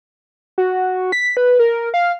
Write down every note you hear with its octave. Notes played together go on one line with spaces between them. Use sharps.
F#4
B6
B4
A#4
F5